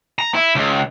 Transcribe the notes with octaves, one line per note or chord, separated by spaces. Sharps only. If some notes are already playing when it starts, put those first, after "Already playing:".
A#5
E4
C#2